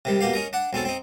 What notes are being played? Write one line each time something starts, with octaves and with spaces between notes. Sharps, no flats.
C3 D#3 G3
B2 A#3 G4 F5
C#4 D#4 A#4
D4 F#5
B1 C4 C#4 A4
C4 D#4